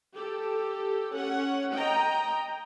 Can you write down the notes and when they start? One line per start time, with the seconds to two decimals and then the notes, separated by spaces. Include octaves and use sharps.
0.14 G4 A4
1.13 C#4 F#5
1.72 D#5 G5 A#5